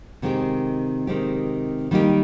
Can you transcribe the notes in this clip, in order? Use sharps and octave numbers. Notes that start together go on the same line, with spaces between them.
C3 D#3 G#3 C4 G4
C3 D#3 G#3 C4 G4
D#3 G3 A#3 D#4 G4